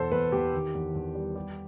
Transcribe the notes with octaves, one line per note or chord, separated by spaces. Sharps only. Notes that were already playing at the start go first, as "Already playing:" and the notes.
Already playing: E2 B2 A4 C5
E2 B4
E2 G4
D#3
E2
E2
G3
G3